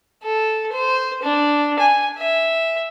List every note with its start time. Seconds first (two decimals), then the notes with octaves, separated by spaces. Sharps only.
0.24 A4
0.72 C5
1.23 D4
1.79 G#5
2.18 E5